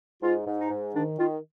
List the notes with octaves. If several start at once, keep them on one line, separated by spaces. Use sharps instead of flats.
G#2 F4
G#2
D#4
G#2
D#3 D4
D#3 F4